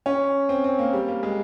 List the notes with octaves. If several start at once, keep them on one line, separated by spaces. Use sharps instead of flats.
C#4
C4
C4
A#3
G3
A#3
G#3